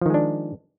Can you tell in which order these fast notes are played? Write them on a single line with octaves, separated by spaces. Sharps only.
F3 D#3 G#3 D4